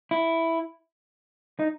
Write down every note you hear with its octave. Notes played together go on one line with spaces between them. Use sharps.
E4
D#4